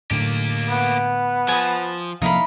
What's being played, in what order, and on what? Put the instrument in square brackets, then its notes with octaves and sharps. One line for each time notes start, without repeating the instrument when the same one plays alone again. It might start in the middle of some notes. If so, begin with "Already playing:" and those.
[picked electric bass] A2 D3 [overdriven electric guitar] A#3 G4
[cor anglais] B3
[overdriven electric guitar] F3 [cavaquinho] G#5 D#6
[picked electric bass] C3 F3 A#3 [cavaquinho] D#4 E4 B5 [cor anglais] F5